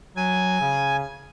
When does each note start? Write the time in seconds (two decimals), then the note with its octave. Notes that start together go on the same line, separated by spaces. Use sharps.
0.16 F#3 G#5
0.60 C#3